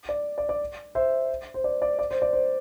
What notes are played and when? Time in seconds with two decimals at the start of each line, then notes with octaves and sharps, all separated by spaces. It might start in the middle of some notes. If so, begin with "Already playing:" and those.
0.09 D5
0.38 D5
0.49 D5
0.95 C5 E5
1.54 C5
1.64 D5
1.82 D5
1.99 D5
2.11 C5
2.22 D5
2.33 C5